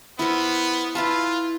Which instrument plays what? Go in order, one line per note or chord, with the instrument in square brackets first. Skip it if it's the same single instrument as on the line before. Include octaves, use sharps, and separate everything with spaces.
[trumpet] B3 [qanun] E4 A#4 C5
[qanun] E4 B4 A5 [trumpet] F4